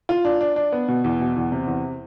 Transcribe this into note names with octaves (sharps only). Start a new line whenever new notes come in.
F4
D4
D4
D4
B3
B2
E2
B2
E2
C3
E2